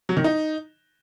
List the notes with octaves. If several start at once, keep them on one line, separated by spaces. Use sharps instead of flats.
F#3
D#3
D#4